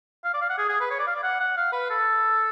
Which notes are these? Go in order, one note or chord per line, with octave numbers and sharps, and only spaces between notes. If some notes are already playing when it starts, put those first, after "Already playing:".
F5
D5
F5
F#5
G#4
G#4
B4
C#5
D5
F5
D5
F#5
F#5
F5
B4
A4